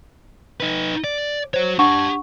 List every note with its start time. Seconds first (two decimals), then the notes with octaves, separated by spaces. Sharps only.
0.60 D#4 B4
1.04 D5
1.54 F#4 C5 C#5
1.79 D4 G4 F#5 A5 C#6